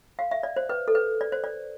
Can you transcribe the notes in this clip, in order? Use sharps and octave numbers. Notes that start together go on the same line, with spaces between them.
F5
E5
D5
C5
B4
A4
B4
D5
C5
D5